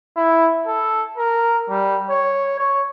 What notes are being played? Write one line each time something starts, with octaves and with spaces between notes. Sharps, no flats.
E4
A4
A#4
G3
C#5
C#5